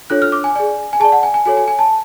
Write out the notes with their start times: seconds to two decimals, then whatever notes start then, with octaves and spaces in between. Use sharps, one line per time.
0.10 D4 F4 A4 C#5 F#6
0.22 F6
0.32 D6
0.44 G#5
0.55 G#4 D5 G#5
0.93 G#5
1.00 G#4 D5 A5
1.12 F#5
1.23 G#5
1.34 G#5
1.45 F#4 A4 C#5 G#5
1.57 G#5
1.68 G#5
1.79 A5